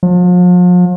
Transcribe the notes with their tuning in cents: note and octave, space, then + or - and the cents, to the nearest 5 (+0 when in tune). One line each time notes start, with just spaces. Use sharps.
F3 +40